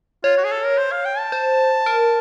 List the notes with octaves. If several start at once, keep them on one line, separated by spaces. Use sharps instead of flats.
F4 C#5
F#4
G#4
A4
A#4
C5
F5
G5
A5
C5
A#4